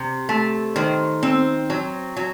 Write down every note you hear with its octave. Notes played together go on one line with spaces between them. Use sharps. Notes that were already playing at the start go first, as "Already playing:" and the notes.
Already playing: C3
A3
D#3 C5
C4
F#3
F#3